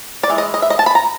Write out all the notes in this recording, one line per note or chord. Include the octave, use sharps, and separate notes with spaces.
D5
E3 G#3
D#5
D#5
E5
D#5
A5
B5
A#5